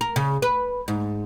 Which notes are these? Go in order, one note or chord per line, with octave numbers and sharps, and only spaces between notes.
A#4
C#3
B4
G#2